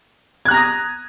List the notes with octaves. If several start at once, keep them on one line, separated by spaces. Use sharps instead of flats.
A#5 D#6 F#6 G#6 A#6